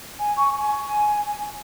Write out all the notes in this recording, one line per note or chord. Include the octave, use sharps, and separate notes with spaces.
G#5
C#6
G#5